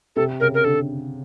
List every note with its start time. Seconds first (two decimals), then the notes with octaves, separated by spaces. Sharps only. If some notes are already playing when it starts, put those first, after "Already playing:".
0.16 C3 A4
0.40 C#3 A#4
0.54 A#4
0.64 D3 A4